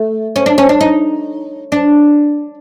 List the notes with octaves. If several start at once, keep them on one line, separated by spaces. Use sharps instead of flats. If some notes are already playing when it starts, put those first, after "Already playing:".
Already playing: A3
C#4
D4
C#4
D4
D#4
D4